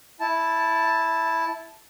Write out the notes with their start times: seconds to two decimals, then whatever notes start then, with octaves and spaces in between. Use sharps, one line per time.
0.20 E4 A5